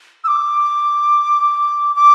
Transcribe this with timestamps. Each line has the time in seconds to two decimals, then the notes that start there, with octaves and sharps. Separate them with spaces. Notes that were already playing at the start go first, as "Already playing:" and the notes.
0.24 E6
0.28 D6
1.96 D6